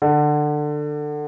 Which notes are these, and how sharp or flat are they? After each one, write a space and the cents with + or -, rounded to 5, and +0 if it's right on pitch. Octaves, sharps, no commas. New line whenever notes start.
D3 +20